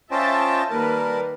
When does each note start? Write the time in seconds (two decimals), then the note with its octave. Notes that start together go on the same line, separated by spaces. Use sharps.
0.11 C#4 F4 C5 D#5 E5 G5 A5
0.69 D#3 G3 A#3 A#4 B4 A5